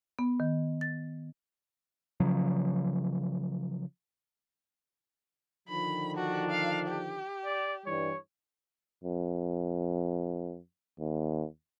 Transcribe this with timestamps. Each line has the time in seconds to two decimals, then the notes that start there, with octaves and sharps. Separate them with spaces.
0.19 B3
0.40 D#3
0.81 A6
2.20 C#3 F3 F#3
5.69 D3 D#3 F3 B5
6.17 D4 F#4
6.51 F5
6.87 G4
7.45 D5
7.86 G2 E3 G3 C#5
9.04 F2
10.99 D#2